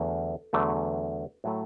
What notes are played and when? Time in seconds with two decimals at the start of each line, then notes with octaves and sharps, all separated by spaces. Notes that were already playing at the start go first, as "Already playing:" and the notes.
Already playing: E2 D3 F#3 A3 A4
0.53 E2 D3 F#3 A3
1.44 A2 F#3 A3